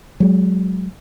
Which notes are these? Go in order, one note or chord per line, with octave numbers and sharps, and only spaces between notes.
F#3 G#3